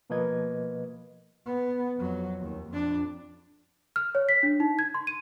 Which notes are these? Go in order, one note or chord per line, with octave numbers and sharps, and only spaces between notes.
B2 F3 A#3 B4 D#5 G#6
B3
F2 F#3
D#2
F2 D4
F6
C#5
B6
D4
D#4
G#6
C6
D#7